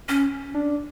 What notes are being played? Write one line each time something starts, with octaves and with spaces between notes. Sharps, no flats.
C#4
D4